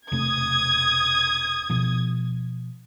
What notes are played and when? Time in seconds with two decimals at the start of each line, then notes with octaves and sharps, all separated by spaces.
0.12 E1 C3 A3 D#6 G#6
1.70 B2 F3